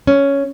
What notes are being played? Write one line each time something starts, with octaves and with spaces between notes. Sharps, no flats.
C#4